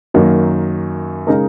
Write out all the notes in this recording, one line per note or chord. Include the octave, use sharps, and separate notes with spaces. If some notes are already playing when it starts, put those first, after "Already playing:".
F#2 D#3 F#3 A#3
C#3 G#3 D#4 A#4